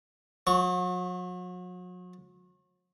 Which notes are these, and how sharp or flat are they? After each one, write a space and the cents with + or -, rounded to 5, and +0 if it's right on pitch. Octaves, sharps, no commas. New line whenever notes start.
F#3 -40 C#6 +0